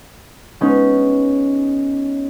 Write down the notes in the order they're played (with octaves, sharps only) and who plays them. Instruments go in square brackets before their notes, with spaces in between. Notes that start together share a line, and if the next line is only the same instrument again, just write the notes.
[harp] G#3 B3 C#4 D#4